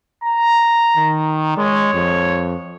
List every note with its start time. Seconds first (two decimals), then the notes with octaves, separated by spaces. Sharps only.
0.24 A#5
0.96 D#3
1.57 G#3 C#5
1.94 F2